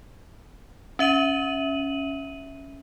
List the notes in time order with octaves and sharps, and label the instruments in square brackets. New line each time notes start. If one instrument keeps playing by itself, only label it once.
[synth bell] C#4 E5 D#7 F#7